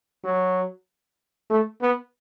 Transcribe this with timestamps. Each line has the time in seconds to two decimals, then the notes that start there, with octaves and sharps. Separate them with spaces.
0.24 F#3
1.50 A3
1.81 B3